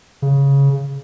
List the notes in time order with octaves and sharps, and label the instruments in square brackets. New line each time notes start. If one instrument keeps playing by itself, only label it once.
[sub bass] C#3